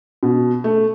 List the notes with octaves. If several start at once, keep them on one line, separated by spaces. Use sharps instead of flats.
B2
A3